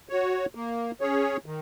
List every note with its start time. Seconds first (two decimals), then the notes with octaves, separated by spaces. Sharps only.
0.09 F#4 C#5
0.55 A#3
1.01 C#4 G#4 C#5
1.46 D#3